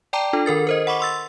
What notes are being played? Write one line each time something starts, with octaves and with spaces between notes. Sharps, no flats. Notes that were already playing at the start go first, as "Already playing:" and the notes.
D5 G5 A5 A#5 D6
D4 F4 A4
D#3 A4 A#4 A6
A#4 C5 D#5
F#5 B5 C#6 D6
C6 E6 A6